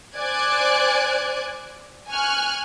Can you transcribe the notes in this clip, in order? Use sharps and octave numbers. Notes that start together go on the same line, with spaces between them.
C5 D5 G#5 F#6 G#6
G#5 C#6 F6 F#6